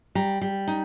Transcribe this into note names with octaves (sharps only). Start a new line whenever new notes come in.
G3 A#5
G3
D#4